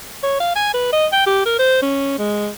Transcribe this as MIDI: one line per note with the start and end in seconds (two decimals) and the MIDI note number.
0.23 0.37 73
0.40 0.55 77
0.56 0.72 80
0.74 0.92 71
0.93 1.07 75
1.12 1.23 79
1.26 1.43 67
1.46 1.58 70
1.59 1.79 72
1.82 2.17 61
2.19 2.49 56